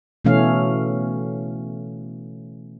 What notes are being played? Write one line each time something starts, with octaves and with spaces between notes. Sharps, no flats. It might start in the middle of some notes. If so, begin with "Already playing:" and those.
B2 E3 A3 C#4 F5